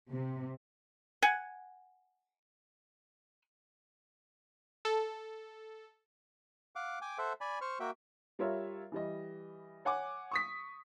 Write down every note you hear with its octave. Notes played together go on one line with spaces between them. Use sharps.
C3
F#5 G#5
A4
F5 F#5 D6
G5 G#5 D6
A4 C5 E5 F#5
D5 G#5 B5
C5 C#6 F6
A#3 F#4 E5 G5
G3 F4 A#4 C#5 E5
E3 G3 D#5
C#5 F#5 G#5 D6
C#6 D#6 B6